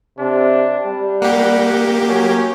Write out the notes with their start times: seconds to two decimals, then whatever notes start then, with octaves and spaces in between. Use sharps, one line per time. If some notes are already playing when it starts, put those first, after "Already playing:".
0.19 C3 D4
0.85 G3
1.22 A#3 G4 F#5
2.09 F#3 C#4